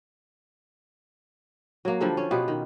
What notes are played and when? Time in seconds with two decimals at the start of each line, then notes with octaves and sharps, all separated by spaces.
1.85 F#3 A#3
2.01 D3 F3 G3 A4
2.17 C#4
2.31 B2 B3 F4 G4
2.48 D#3